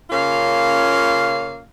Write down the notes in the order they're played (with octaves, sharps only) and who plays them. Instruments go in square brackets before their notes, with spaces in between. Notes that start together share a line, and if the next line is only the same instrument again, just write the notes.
[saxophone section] C#3 A#3 C#4 F4 F5